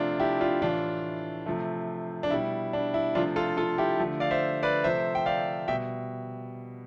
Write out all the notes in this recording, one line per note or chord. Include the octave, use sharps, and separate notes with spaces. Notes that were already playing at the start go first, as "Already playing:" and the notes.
Already playing: C3 F3 A3 D4 F4
E4 G4
D4 F4
A2 E3 A3 D4 F4
C3 F3 A3
D4
B2 G3 E4
D4
E4
C3 F3 A3 D4 F4
F4 A4
F4 A4
E4 G4
D3 F3 A3
D5 F5
C5 E5
B4 D5
C3 F3 A3 C5 E5
G5
D5 F5
B2 G3 E5 G5